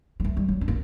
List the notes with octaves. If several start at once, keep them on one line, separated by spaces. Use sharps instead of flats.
G3
A3
G3
F#3
D4
A#3